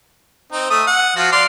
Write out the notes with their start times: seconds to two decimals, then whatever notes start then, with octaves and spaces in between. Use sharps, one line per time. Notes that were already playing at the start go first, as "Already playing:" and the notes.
0.52 C4 D#4
0.70 A3 D#6
0.87 F#5
1.16 F3 F4 F#4
1.32 D5 F5 C6